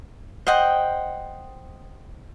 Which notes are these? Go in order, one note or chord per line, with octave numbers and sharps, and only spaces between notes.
C5 D#5 F#5 G5